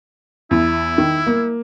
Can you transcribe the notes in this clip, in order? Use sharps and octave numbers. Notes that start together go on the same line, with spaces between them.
E2 E4
D#3
A#3